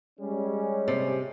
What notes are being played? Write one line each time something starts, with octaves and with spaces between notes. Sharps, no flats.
G3 G#3 C#4
C3